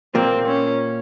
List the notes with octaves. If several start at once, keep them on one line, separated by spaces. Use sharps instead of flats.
A#2 A#3 C4
C#4